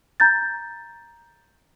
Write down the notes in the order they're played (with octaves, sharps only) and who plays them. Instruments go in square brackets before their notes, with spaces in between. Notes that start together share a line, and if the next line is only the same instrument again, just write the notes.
[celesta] A#5 G6 A6